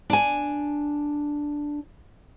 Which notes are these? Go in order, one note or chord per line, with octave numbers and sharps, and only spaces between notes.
D4 G#5